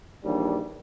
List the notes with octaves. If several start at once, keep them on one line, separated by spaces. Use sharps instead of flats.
A#1 D#2 E3 G3 D4